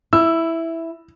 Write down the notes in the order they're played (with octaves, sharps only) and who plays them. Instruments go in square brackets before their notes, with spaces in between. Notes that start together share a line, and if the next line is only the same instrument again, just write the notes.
[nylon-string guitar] E4 [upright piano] E6